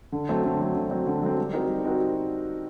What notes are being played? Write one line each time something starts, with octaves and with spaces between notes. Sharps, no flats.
D3
F#3 A3 C4
D3
F#3 A3 C4
D3
F#3 A3 C4
D3
F#3 A3 C4
G3
C4 D#4 F#4 A#4
G3
C4 D#4 F#4 A#4